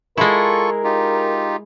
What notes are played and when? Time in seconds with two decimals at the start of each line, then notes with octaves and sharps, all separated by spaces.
0.18 G#3 E4 F4 A4 A#4 C#6
0.84 D#4 F4 G4